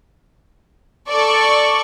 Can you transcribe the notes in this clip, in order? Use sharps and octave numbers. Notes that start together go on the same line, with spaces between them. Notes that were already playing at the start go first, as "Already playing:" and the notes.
A4 D5 C#6